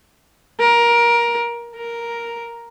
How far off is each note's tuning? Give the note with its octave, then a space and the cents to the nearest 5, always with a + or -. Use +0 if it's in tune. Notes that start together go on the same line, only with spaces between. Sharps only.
A#4 +20
A#4 +5